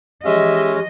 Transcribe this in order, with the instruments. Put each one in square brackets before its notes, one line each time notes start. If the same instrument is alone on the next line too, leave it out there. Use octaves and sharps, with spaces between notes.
[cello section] E3 F3 D#5 [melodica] G#3 C#4 [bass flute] G4 [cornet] E5